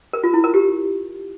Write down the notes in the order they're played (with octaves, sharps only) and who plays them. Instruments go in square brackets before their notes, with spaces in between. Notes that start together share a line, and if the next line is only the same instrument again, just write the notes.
[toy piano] A#4
F4
E4
A#4
G4